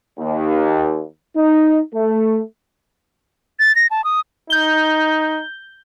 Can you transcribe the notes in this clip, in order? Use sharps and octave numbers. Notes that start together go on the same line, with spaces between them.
D#2
D#4
A3
A6
A#6
A5
D#6
D#4 G6 G7